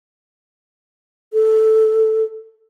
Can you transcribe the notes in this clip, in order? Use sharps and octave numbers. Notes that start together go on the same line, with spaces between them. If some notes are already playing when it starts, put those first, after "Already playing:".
A4